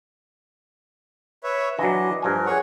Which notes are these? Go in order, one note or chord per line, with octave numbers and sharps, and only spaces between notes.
B4 C#5 E5
E3 F#3 D4 D#5
G2 F3 A#4 G#5
G#4 C#5 F#5